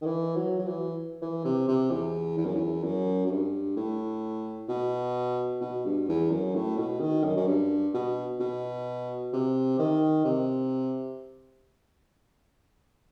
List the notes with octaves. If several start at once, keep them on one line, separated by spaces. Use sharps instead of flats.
D#3
E3
F#3
F#3
E3
E3
C3
C3
E2
E2
F#2
E2
F#2
F#2
G2
A2
B2
B2
G2
E2
F#2
A2
B2
D#3
F#2
F#2
G2
B2
B2
C3
D#3
C3